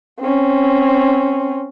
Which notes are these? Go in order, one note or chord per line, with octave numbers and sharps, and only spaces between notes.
C4 C#4